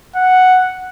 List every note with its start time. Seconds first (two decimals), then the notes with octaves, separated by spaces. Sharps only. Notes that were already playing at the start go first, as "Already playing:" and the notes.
0.16 F#5